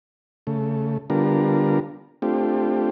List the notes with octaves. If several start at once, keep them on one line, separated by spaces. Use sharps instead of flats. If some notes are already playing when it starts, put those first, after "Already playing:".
C#3 A3
D3 G3 B3 D4 F4 A#4
A3 C4 D4 F4 G4